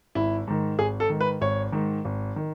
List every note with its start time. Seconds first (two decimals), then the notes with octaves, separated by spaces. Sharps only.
0.15 G#1 E4
0.47 G#2 D#3
0.79 G#1 G#4
1.00 A4
1.09 G#2 D#3
1.20 B4
1.41 G#1 C#5
1.72 G#2 D#3
2.05 G#1
2.36 D#3